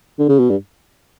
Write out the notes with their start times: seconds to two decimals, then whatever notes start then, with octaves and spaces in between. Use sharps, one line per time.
0.19 D3
0.29 C#3
0.39 B2
0.50 G2